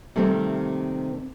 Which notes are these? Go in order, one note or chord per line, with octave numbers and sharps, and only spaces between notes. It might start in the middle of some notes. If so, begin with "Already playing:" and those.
C3 D#3 G3 A3 A#3 C4